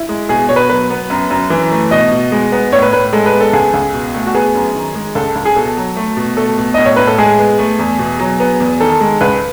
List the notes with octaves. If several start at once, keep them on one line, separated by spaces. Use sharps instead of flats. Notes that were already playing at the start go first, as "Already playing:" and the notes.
Already playing: E4
G#3
B2 G#4
B2 C#5
B4
F#3 B4
B3
F#2
F#2
E3
A3
B2 D#5
B2
G#3
B3
A2 C#5
B4
A2 B4
G#3 A4
B4
B3
A4
C#2 G#4
C#2
B2
A3
F#4
B3 G#4
F#2
D#3
G#3
C#2 A4
C#2
G#4
B2 A4
F#3
A3
B2
A3 A4
B2
A2 D#5
C#5
A2 B4
A4
G#3 G#4
B3
A3
E2
B2
F#3
B3
E2
D#3 A4
G#3
C#2 B4